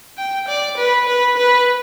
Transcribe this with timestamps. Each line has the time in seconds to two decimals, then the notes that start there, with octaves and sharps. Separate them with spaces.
0.18 G5
0.48 D5
0.77 B4
1.08 B4
1.37 B4